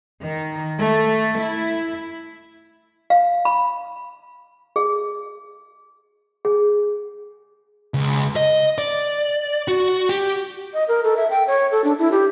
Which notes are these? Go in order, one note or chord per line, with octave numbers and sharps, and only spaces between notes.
D#3
A3
E4
F5
B5
G#4
G#4
C#2
D#5
D5
F#4
G4
D#5
A#4
A4
E5
G5
C#5
A4
D4
E4
G4